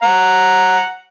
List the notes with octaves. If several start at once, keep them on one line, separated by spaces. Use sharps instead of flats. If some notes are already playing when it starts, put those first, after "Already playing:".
F#5 A#5